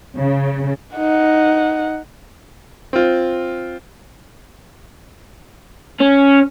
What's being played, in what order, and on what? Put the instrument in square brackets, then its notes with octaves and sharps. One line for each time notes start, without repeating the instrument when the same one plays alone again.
[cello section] C#3
[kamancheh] D#4 F#5
[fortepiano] C4 F4
[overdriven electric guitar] C#4